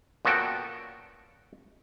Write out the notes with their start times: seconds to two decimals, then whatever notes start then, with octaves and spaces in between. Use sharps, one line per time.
0.25 A#2 B3 C#4 F#4 A4 G5